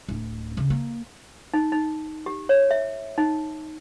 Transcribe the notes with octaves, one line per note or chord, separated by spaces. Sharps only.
D1
C#3
A#3
D#4
D#4
G4
C#5
E5
D#4